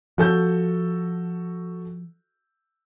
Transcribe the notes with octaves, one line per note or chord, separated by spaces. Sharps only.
F3 F#4 A4 G6